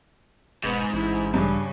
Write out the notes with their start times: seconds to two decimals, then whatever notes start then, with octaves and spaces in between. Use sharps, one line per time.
0.64 E1 G#2 B3
0.93 A1 E4
1.34 G2 C#3 G3